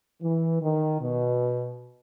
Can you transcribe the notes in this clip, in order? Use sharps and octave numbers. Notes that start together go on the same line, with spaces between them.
E3
D#3
B2